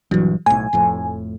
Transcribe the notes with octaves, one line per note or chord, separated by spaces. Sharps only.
A#1 G2 E3 F#3
B1 A2 G#5
F1 F2 A2